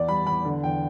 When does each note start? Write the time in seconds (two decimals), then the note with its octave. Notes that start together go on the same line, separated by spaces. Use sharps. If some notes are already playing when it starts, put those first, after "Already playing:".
Already playing: E2 D5
0.08 G3 B5
0.27 E2 B5
0.45 D3
0.63 E2 G5